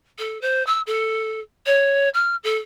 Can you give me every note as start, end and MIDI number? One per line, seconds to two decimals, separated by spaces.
0.19 0.40 69
0.41 0.65 72
0.67 0.81 88
0.87 1.40 69
1.66 2.09 73
2.14 2.36 89
2.44 2.58 69